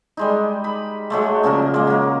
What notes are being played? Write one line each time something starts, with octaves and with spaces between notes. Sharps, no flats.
G3 G#3 D#4
B5
F#3 G#3 A3
A#2 C#3 F3 A#4
G#3 A#3
F#3 A#4